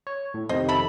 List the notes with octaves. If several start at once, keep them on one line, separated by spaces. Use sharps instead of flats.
C#5
A2
F2 C3 D#3 C5 D#5
A4 E5 B5